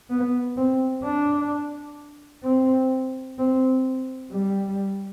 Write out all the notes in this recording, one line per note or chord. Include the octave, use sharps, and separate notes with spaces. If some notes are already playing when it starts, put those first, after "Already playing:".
B3
C4
D4
C4
C4
G3